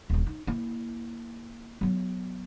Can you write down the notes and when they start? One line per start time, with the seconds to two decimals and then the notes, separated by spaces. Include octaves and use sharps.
0.10 D#1 C#3
0.27 D#4
0.47 A#3 E4
1.81 F#3 B3